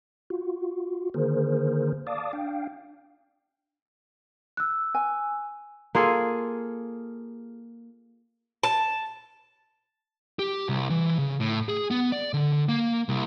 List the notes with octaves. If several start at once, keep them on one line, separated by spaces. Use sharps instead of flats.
F4 F#4
D3 D#3 A#3 G#4 A#4 C5
D5 F5 A5 D6 D#6
D4 F5 G5
E6 F#6
G#5
A#3 F4 G#4 A4
A5
G4
C2
E3
C#3
A2
G#4
B3
D5
D3
A#3
C2